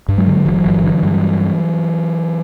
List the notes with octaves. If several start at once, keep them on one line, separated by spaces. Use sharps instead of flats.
G2
F#3 G#3
D3
G1 E3 F#3
G1
D3
G2